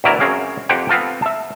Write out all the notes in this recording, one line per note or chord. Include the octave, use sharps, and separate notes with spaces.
D2 B2 F#3 E4 A#4 D5
F#2 C4 C#4 G#4 F5
F2 G4 C5 F#5 G5
B3 C4 F4 A4
E5 A5